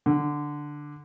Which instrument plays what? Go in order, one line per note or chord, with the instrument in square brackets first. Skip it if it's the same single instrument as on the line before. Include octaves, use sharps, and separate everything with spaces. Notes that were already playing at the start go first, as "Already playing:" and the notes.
[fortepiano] D3